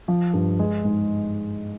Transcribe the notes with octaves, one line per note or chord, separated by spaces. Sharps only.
F3
G2
G#3
G#2